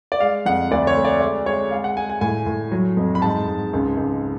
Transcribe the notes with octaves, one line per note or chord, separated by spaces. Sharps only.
D5
G#3 F5
F2 F#5
D2 D5
C#5
A3
D5
G#3 D5
G#3 C#5
G#3 F5
F#5
G#3 G#5
G#5
A2 G#5
A2
F#3
F2
B5
G#2 A5
G#2
C#2
C#2